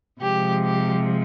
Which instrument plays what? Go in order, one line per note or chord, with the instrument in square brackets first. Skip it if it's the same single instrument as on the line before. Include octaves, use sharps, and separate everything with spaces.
[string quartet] C3 F3 G#3 G4
G4